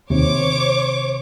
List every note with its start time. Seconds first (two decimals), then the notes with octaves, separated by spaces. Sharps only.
0.10 D#2 C3 C5 C#5 D6